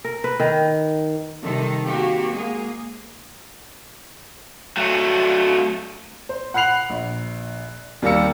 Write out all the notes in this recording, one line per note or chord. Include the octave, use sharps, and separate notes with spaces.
A#4
B4
D#3
C3 D#3 G3 A4
A#3 C4 F#4 G4
G#3 A#3 G#4
F#3 A3
C5
F#5 B5 F#6 C7 F7 F#7
A#1
D#2 G3 A#3 A#4 E6 C#7